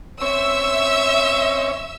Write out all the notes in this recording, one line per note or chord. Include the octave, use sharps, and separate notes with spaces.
C4 C#4 C#5 E5 E6